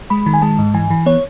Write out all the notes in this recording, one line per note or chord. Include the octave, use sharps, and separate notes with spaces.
G#3 B5
D#3
G#5
G#3 A5
G#2
E3 G#5
E3
B3 C#5